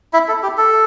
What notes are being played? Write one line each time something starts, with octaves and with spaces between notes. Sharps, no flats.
E4 E5
A4
G4
A4